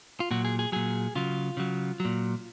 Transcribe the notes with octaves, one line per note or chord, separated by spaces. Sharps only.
F4
A#2 F#3 F#4
G#4
G#4
A#2 F#3 G#4
C#3 F#3 F4
C#3 F#3
F#3
A#2